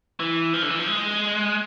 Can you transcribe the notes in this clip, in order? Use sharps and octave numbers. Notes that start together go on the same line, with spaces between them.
E3
F3
D3
E3
F3
G#3